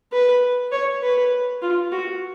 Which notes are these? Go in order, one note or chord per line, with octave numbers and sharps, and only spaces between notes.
B4
C#5
B4
F4
F#4